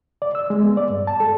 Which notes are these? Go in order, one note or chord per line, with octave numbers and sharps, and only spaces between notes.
D5
E6
G#3
B3
D5
G2
A5
A4